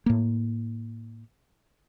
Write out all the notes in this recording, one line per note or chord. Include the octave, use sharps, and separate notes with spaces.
A2 A#3